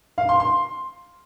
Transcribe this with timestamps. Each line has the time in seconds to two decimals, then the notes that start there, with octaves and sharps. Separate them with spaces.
0.18 F5
0.29 C6
0.40 C6